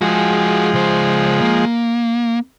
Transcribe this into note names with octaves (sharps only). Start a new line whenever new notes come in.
F3 G#3 F#4 G#4
C#2 C5
A#3